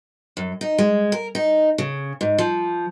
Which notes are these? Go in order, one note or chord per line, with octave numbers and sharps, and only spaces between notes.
F#2
D#4
G#3
A#4
D#4
C#3
G#2
F3